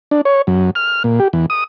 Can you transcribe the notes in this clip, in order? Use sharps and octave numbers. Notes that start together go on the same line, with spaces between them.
D4
C#5
F#2
F6
A#2
G4
E2
D#6